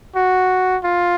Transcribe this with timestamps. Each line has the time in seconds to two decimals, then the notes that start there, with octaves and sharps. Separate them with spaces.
0.16 F#4
0.84 F4